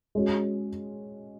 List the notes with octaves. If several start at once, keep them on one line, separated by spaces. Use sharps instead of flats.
G#3 C#4 F#4